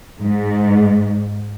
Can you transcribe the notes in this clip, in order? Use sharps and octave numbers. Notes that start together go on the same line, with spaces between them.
G#2